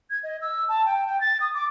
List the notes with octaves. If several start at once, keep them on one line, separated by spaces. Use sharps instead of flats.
G#6
D#5
E6
A5
G5
G5
A6
D#6
D6